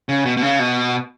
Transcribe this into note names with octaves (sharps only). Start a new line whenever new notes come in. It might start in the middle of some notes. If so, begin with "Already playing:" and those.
C#3
B2
B2
C#3
B2